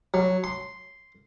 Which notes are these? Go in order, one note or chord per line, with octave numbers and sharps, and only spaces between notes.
F#3
C6